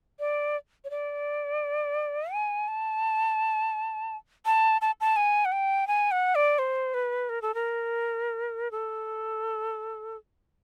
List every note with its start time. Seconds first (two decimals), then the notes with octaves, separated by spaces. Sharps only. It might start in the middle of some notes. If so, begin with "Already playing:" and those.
0.19 D5
0.85 C#5
0.90 D5
2.32 G#5
2.68 A5
4.45 A5
4.81 A5
5.01 A5
5.16 G#5
5.45 F#5
5.52 G5
5.87 G#5
6.11 F#5
6.35 D5
6.59 C5
6.94 B4
7.29 A#4
7.42 A4
7.55 A#4
8.71 A4